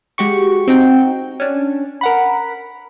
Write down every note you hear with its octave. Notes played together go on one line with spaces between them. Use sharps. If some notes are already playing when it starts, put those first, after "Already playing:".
G#3 F#4 G4 C#6
C4 D#4 F#4 G5
C#4 D4
A#4 F#5 B5